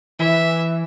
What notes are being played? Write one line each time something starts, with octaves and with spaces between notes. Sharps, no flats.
E3 E5